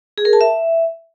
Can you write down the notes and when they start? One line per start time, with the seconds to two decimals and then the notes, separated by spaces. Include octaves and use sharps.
0.18 G#4
0.25 A#4
0.33 A5
0.41 E5